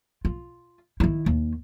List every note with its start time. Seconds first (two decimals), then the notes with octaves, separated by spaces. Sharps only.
0.25 F4
1.00 D#3 E4
1.26 D#2